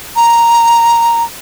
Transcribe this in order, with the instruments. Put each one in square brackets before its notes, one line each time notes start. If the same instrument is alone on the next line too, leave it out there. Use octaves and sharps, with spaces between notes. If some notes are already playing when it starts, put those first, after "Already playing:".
[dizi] A#5